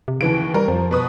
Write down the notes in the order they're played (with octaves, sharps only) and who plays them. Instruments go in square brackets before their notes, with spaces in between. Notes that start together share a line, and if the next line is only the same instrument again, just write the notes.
[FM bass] C3
[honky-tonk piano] D#2 E3 D7 [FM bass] C#3
[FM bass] G3 [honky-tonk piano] A#4
[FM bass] F2 [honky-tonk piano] F3
[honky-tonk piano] B2 B4 D#6